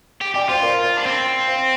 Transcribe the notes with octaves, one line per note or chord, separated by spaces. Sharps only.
G4
G4 D5 G5
F4 C5 F5
A#4 D5
C5 F5
D4
C4
C5 F5